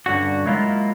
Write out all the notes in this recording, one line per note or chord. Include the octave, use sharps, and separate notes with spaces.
G2 D3 C#4 F#4
F#3 G#3 A#3 E4 F4